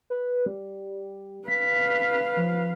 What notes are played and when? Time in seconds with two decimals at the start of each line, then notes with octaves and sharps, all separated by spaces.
0.10 B4
0.46 G3
1.48 B4 F5 B6
2.37 F3